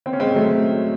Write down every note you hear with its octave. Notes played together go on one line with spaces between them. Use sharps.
C4
C#4
G#3 C4
F#3 A3